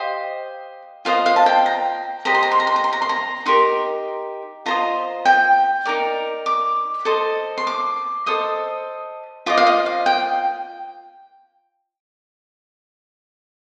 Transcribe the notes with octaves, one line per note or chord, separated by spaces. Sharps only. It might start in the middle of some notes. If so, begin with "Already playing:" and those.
Already playing: G4 C5 D#5 F5
F4 C5 D#5 F5
F5
A5
G5
A#5
G4 C5 D#5 A#5
C6
A#5
C6
A#5
C6
A#5
C6
A#5
C6
A#5
D#4 G4 A#4 C6
F4 C5 D#5 A#5
G5
D#4 A#4 D5
D6
A4 C5 D#5
C6
D6
A4 C5 D#5 D#6
F4 C5 D#5 D6
F5
D#5
F5
G5